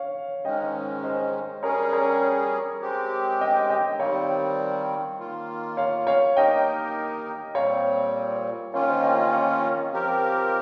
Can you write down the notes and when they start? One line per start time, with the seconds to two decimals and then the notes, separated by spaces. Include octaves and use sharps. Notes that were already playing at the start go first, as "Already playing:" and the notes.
Already playing: C#5 F5
0.44 G#2 D#3 G#3 C#4 D#5 G5
1.04 C5 D#5
1.63 G3 C#4 G#4 A#4 C#5
1.93 A#4 C#5
2.81 G#3 C4 G4
3.41 D#5 G5
3.70 D#5 G5
4.00 D#3 G3 C4 C#5 F5
5.19 D#3 A#3 F4
5.77 C#5 F5
6.07 C#5 F5
6.37 D#3 A#3 D#4 G4 A#4 D#5 G5
7.55 A#2 G3 C4 C#5 F5
8.74 D#3 A#3 C#4 F4 C#5 F5
8.89 C5 D#5
9.03 D#5 G5
9.18 D#5 G5
9.33 C#5 F5
9.92 F3 C4 G4 A#4